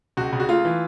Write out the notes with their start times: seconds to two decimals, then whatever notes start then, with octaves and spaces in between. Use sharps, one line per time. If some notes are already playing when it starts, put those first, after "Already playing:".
0.17 C#2 F#4
0.33 C#3
0.40 F#4
0.49 A3 F4
0.65 E3